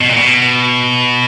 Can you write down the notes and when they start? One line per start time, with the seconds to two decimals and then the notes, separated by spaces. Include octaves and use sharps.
0.01 B2
0.09 A#2
0.16 B2